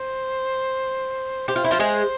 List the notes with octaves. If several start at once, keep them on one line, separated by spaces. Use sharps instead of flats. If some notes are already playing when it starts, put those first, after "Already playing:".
Already playing: C5
G4 C5
F4
E4
F3 F4
G#3 G#4